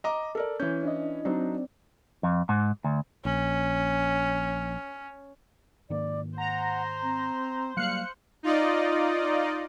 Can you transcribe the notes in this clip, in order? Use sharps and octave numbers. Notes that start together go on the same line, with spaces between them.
D#5 A#5 D6
A4 A#4 D5
E3 C#4 G6
D4 E4 D#5
F#3 C4 D4 D#4 D5
F2
G#2
D2
A#1 C#4
G#2 D#3 A#3 D5
C5 F#5 A#5
C4
F#3 G3 A#3 F5 F#6 C#7
D#4 F4 D5 D#5